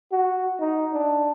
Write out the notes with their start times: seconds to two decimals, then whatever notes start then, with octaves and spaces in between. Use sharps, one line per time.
0.12 F#4
0.60 D#4
0.93 D4